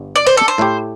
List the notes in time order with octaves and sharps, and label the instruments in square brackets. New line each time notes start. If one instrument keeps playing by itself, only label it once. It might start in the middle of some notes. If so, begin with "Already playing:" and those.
Already playing: [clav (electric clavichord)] G1 G2
[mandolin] D5
C5
A4
C5
[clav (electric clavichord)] A2 A3 E4 G4